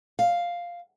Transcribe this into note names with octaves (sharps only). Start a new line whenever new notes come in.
F5